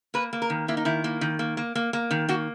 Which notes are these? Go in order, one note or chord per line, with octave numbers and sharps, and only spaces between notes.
A#3 B4
A#3
A#4
D#3
A#3 E4
D#4
D#3 E4
A#3
D#3
A#3
A#3
A#3
A#3
D#3
A#3 F#4